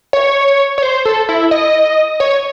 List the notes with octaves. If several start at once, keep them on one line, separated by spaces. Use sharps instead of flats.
C#5
C#5
C5
A4
E4
D#5
C#5